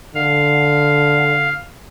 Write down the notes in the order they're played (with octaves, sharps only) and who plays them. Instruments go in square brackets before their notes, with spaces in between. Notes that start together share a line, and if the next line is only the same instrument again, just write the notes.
[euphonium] D3 [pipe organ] F5